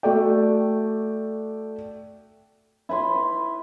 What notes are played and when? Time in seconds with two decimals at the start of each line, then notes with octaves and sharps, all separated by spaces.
0.03 A3 F#4 A4 D5 G5
2.89 E4 B4 B5 C6